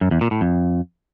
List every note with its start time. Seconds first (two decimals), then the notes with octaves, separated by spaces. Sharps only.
0.01 F#2
0.11 E2
0.21 A#2
0.31 A2
0.41 F2